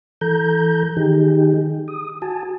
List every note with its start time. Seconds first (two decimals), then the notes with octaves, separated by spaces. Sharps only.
0.21 E3 A4 A#5 G6
0.97 D#3 D#4 G4 G#4
1.88 D#6
2.22 F#4 G#5 A5